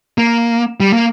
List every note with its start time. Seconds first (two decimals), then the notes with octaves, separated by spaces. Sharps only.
0.18 A#3
0.80 G3
0.93 A#3